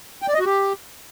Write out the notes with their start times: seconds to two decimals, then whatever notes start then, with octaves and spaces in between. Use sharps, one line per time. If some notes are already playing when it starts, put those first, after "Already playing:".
0.22 G5
0.28 D5
0.34 D#5
0.40 F#4
0.46 G4